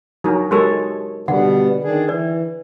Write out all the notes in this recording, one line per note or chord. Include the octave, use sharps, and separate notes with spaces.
F#3 D4 D#4 A#4
G#3 F#4 G4 A4 A#4 C#5
B2 D3 G3 B3 F#5
D#3 D4 G#4
E3 B4 D5